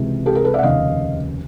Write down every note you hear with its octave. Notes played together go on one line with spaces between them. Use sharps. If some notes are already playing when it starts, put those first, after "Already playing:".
Already playing: C#2 C3 E3 G#3
G4 A4
G#4 A#4
A4 B4
D5 E5
F#5
F1 D#2 C#3 D#5 F5